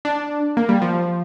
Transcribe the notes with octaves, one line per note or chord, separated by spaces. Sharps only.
D4
A#3
G3
F3